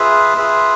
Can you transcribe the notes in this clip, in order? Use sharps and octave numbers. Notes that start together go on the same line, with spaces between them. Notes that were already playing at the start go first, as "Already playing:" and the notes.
Already playing: F4 G#4 B4 E5
F4 G#4 B4 E5